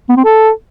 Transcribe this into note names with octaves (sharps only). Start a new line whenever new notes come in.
B3
C4
A4